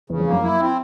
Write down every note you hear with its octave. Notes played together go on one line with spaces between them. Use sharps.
E2 C#3 E3
F2 F3
A#3
F#2 F#3
E4
C4